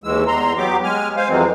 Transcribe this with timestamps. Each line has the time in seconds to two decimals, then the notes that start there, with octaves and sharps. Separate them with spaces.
0.04 D#2 E3 G#3 E6
0.27 E2 A#5 C6
0.58 F#3 B3 G4 D6
0.84 G#3 G#5 F6
1.16 C5 F5 G#5
1.29 F2 E3 F#3 G#3 C4